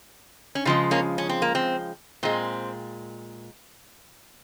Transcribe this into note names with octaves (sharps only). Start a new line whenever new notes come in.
C#4
C#3 F3 G#3 C4
A#3 C#4
C#4
C4
A#3
C4
A#2 G#3 C4